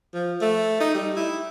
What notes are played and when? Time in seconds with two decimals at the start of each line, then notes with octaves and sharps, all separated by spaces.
0.14 F3
0.41 A3
0.80 D#4
0.94 G3
1.16 E4